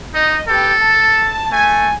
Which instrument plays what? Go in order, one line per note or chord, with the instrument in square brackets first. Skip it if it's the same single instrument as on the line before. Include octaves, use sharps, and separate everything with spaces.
[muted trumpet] D#4 [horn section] D#5
[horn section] G4 B4 G5 [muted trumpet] A4
[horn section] A5
[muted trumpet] A3 [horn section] G#5